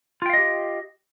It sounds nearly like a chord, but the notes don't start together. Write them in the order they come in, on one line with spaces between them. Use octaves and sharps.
F4 G5 F5 D#5 G4